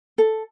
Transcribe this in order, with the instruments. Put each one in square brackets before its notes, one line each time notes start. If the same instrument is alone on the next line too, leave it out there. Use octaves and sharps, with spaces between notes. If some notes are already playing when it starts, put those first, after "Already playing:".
[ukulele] A4